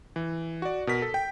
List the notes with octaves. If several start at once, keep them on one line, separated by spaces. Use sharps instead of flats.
E3
F#4 D5
B2 A#4 B6
A4
G5